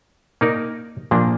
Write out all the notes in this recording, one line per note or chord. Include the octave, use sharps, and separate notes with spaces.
A#3 D#4 A#4 D5
A#2 F3 A#3 D4